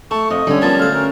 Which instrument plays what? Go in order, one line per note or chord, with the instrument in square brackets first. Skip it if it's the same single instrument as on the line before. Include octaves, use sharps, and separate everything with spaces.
[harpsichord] A3 [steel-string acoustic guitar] A5 [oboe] C#6
[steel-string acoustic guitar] F2 [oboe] D#5
[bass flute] D3 [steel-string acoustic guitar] G3 C#4
[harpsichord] F3 A#3 [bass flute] B3 [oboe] A5
[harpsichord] D2 C5 [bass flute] A4 [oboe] F5
[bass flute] C#4 [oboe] A#4